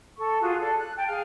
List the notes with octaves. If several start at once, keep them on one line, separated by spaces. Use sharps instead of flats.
A4 C#6
F4 F#4 G#4
A4 D5
F#6
G5 A5
G#4 F5